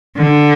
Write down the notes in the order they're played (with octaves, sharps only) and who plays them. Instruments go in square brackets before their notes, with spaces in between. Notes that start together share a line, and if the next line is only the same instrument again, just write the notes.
[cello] D3